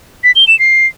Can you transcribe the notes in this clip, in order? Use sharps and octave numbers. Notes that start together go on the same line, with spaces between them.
B6
G7
E7
C7